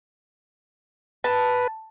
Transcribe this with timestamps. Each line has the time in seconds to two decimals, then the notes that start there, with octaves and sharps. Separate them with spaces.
1.24 B4 A5